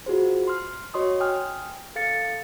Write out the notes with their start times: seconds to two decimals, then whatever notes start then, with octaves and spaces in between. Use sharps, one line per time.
0.06 F4 F#4 G#4 C5
0.48 C6 F6
0.94 F#4 C#5 D#5 C6 C#6 D#6
1.20 G5 G#5 D#6 F6
1.96 A4 F5 A6 C#7